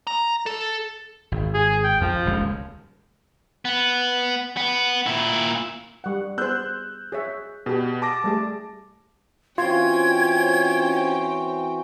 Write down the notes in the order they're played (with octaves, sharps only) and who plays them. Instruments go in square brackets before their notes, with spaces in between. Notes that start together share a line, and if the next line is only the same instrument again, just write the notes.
[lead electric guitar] A#5
A4
[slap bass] G#1
[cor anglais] G#4
G5
[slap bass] F2 [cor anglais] F3
[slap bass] D#1 C#2 G#3
[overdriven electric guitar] B3
B3
A#2 E4
[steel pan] G3 F#5
[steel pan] B3 G#4 C5 [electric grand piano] E6 F#6 G6
[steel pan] G#4 C#5 E5
[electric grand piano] B2 [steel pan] G4 G#4
[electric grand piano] A5 D6 A#6
[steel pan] G3 A3 G#4
[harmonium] E3 C4 F#4 [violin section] C#4 C5 G5 [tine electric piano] F4 [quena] G#6